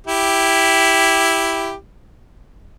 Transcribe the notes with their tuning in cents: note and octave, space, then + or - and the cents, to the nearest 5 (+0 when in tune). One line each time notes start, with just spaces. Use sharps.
E4 +0 G4 +0